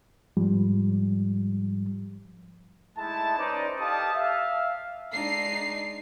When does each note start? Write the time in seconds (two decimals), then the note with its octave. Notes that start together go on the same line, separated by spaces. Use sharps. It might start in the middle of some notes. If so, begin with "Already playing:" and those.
0.37 G#2 F3 G3
2.98 G#3 A3 D#4 E4 A5
3.37 C#4 D#4 B4 C5 D5
3.80 G4 A4 D#5 F5 A5 D#6
4.15 E5 F5
5.12 G#3 D4 D#4 C7